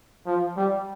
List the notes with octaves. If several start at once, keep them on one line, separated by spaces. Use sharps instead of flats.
F3
G3